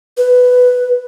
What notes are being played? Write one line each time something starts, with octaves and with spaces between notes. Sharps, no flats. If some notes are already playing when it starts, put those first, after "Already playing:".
B4